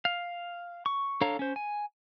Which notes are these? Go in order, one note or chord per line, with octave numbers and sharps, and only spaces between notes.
F5
C#6
D4 A4 C#5 F5 A#5
C#4 C5
G#5